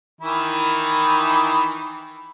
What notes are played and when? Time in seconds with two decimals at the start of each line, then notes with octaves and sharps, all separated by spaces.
0.21 D#3 E3 E4